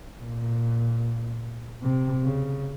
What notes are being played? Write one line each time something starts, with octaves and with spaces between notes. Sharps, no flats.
A#2
C3
C#3